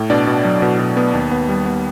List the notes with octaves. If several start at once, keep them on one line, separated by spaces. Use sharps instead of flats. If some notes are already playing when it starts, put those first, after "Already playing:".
Already playing: A2
B2 D4 D5
B2
F#3
B2
B2
B3
D#2
B3
G3
B3